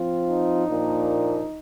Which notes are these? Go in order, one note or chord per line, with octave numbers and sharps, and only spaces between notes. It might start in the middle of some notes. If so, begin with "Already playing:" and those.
Already playing: F3 C4 F4
D#4
A#2 F3 A#3 D4